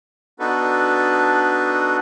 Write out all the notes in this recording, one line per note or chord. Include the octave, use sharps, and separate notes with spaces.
B3 D4 D#4 F#4 A4 B4